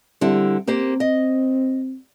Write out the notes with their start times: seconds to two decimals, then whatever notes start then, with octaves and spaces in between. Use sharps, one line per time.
0.21 D3 G3 C4 E4
0.67 A#3 C4 G4 C5
1.00 D#5